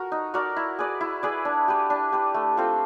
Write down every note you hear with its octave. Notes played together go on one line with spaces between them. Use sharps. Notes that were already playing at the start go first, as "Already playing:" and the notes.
Already playing: F#4 A#4
D#4
F#4 A#4 D5
E4
G#4 B4 D5
E4
G#4 B4 D5
D4
G4 B4
D4
G4 B4
A3
C4 F4 A4